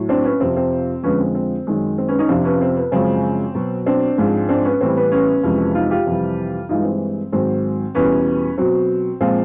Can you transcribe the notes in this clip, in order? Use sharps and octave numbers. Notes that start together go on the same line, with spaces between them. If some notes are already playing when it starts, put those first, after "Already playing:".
Already playing: A2 F#3
C4 D4
B3 C#4
F2 C3 F3 C4
C4
F2 D3 F3 G#3 B3 C#4
C4
C4
F#2 D#3 G#3
C4
B3 C#4
C#4 D#4
F2 C3 F3 C4 D4
B3 C#4
C4
B3
F#2 C#3 F3 G#3 C4
B2 F#3
C4 D4
G#2 F3 G#3
C4 D4
B3 C#4
A2 E3 G3 C4
B3
B3 C#4
F2 C3 E3 G#3
D#4 F4
F4 G4
F2 C3 E3 G3
G2 E3 G#3 D#4 F4
C4
G#2 D#3 F#3 C4
E2 B2 G3 B3 C#4
B2 F#3 C4
A#2 F3 G#3 C4